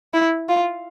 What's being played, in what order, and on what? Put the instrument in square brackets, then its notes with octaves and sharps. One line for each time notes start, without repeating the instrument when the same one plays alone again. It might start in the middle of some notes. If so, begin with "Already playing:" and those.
[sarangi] E4
F4